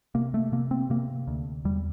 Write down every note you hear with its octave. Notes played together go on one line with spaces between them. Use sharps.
C3 A#3
A3
C3 A#3
C4
C3 A#3
D2
E2 G3